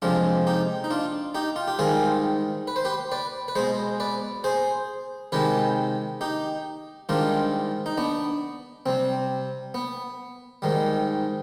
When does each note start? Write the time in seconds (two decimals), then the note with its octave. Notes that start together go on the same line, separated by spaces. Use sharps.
0.02 F2 C3 F3 G#3 D4 F4
0.47 D#4 G4
0.84 D#4
0.91 D4 F4
1.34 D#4 G4
1.56 F4
1.68 G4
1.79 G#2 D#3 G3 F4 G#4
2.67 B4
2.76 C5
2.85 G4 B4
3.12 B4 D5
3.48 B4
3.55 B2 G#3 G#4 C5
4.00 B4 D5
4.44 G#4 C5
5.32 C3 D#3 G#3 G4 B4
6.21 D#4 G4
7.09 G#2 D#3 G3 D4 F4
7.86 D#4
7.98 B3 D4
8.86 C3 G3 C4
9.74 B3
10.62 G#2 D#3 G3